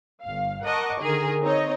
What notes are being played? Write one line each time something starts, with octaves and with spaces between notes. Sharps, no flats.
G1 F5
A#4 D#5 F#5 A5 C#6 D6
D3 D#3 G#4 A#4
C4 D#4 C#5 D#5